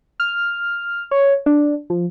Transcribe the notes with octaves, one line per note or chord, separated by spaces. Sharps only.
F6
C#5
D4
F3